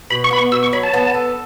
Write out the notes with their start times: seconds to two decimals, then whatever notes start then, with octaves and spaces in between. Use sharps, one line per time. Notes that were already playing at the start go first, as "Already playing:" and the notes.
0.10 B2 B5
0.24 C#6
0.31 B3 B5
0.38 C#6
0.52 B2 E6
0.63 C#6
0.73 F#3 B5
0.83 A5
0.94 B3
1.14 A4